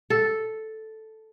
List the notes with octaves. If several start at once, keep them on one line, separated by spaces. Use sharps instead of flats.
A4